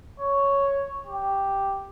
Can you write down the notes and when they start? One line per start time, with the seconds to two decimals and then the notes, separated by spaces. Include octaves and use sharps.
0.20 C#5
1.07 G4